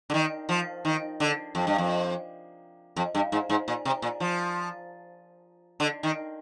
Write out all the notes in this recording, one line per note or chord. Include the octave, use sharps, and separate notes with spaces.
D3
D#3
F3
D#3
D3
F2
G2
F2
F2
G2
G#2
G#2
A#2
C3
A#2
F3
D3
D#3